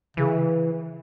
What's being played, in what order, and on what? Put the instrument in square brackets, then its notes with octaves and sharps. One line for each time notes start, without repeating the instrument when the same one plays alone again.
[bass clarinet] C#3 [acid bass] E3